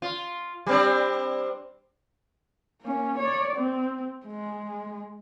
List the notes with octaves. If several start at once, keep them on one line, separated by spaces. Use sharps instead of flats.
F4
G3 C4 D4
A#3 C#4
C#5 D5
C4
G#3